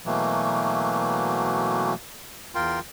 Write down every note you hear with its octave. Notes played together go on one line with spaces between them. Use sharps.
B2 E3 F#3 A3 A#3
E2 F4 A#4 G5 C6